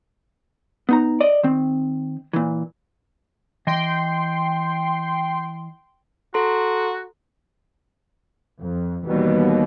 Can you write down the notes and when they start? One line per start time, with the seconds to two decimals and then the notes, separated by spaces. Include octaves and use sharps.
0.89 B3 D#4 A#5
1.21 D5 D#5
1.43 D#3 C4
2.33 A#2 E3
3.67 E3 D#5 G5 C6
6.34 F#4 A4 A#5 C6
8.59 F2
9.07 D#2 B2 E3 G3 B3